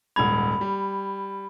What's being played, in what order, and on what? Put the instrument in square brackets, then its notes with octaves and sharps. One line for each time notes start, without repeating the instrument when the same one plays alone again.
[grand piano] D#1 G#2 G#6 [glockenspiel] B5
[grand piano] G3